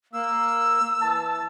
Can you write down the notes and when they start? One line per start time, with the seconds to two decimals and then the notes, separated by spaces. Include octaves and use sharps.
0.13 A#3 E6
1.01 E3 A5